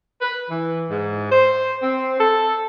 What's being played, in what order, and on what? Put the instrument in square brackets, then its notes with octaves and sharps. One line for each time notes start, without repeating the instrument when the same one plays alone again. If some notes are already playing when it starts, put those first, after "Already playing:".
[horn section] B4
E3
G#2
C5
C4
A4